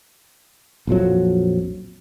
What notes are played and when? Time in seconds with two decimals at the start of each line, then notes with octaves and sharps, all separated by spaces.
0.87 A#1 F2 F3 F#3